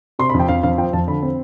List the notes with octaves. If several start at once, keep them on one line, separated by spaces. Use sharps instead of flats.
C3 C6
B5
F2
G5
F2 F5
F2 F5
F3 G5
F2 A5
D3 B5
C4